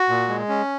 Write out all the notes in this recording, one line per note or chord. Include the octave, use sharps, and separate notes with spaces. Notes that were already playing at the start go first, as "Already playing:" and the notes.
Already playing: F#4
A#2
G#3
C#4